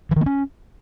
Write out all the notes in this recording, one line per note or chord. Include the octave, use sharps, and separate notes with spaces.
E3
D#3
A#3
C#4